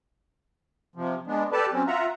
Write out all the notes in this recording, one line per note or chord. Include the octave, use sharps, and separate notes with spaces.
C3 F3
G#3 B3 D4
G4 A4 B4 D5 A5
F#3 C4 C#4
F4 E5 F#5 A#5